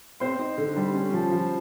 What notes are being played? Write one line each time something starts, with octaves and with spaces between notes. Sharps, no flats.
C4 C5 C6
D#4
D3
G3
C#4
F3
F3